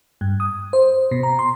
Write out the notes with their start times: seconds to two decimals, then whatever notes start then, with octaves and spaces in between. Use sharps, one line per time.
0.21 G2
0.40 D#6
0.73 C5
1.11 B2
1.23 A#5
1.39 C6